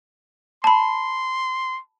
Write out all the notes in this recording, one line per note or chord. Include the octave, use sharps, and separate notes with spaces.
A5 B5 C6